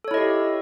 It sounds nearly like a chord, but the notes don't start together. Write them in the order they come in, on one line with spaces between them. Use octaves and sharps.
A4 C#5 E4 D#5 G4